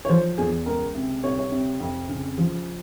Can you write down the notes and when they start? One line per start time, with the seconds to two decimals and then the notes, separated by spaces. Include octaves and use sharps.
0.05 C#5
0.09 F3 C5
0.38 E2 G#4
0.66 C#2 A#4
0.95 C3
1.24 C2 C#5
1.38 C#5
1.52 C3
1.80 F2
2.09 C#3
2.38 F3